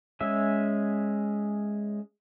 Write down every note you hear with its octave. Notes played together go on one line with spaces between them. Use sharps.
G#3 C#4 E5